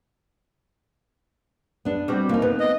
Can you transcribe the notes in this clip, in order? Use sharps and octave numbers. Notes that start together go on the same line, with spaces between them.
B3 D4
G3 C4 F#4
D#2 A#3 D#4
B3
D#5